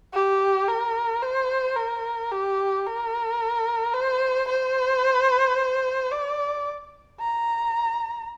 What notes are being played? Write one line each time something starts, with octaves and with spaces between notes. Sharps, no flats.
G4
A#4
C5
A#4
G4
A#4
C5
C5
D5
A#5